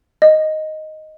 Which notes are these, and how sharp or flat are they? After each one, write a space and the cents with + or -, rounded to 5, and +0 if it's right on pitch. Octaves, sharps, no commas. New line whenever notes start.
D#5 +0